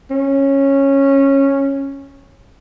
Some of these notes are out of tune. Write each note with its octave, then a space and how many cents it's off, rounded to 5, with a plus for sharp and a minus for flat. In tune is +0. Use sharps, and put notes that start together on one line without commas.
C#4 -10